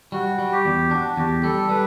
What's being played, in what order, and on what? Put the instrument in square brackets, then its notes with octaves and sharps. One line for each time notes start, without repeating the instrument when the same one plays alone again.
[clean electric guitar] G3 [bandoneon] F#4
[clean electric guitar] G3
[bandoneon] G4
[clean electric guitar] E2
[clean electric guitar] D4 [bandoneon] F#4
[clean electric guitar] E2 [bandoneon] G4
[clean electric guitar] G3 [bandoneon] A4
[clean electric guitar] G3 [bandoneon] B4